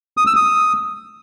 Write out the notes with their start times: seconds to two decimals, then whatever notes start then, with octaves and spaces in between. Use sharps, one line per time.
0.17 D#6
0.27 E6
0.36 D#6